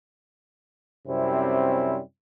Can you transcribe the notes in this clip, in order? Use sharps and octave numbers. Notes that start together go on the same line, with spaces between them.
F#2 C3 G3 C4 C#4 E4